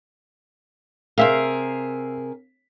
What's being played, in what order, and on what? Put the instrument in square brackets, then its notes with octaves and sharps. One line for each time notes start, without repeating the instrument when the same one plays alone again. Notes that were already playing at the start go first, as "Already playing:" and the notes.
[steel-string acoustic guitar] C3 G#4 A#4 [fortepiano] E5 F5